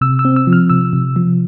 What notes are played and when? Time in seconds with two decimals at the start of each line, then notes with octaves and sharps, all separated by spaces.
0.01 C3 E6
0.19 E6
0.25 C4
0.36 E6
0.47 F3
0.53 F6
0.70 C3 E6
0.93 C3
1.16 F3